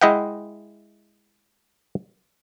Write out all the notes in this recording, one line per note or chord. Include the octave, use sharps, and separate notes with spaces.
G#3 E4 D#5 E5 F#5 G5